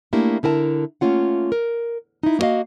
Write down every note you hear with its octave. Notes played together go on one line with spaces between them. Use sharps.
A3 A#3 D4 E4 G4
D3 E4 A#4 G#5 A5
A3 A#3 C#4 F4 F#5
A#4
D#4 E4
A#3 B3 F#4 D#5 F5